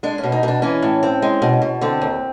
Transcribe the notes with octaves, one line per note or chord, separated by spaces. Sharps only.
G#3 D4
C#4
B2
D#4
B2 D4
E3 C#4
A2
C4
G#3
B2
B2
D3 C4
D#2